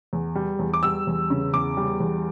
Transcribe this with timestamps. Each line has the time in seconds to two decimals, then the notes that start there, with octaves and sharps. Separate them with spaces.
0.13 E2
0.35 G3
0.59 E2
0.74 D6
0.83 G3 E6
1.07 E2
1.30 C#3
1.53 E2 D6
1.77 G3
2.00 E2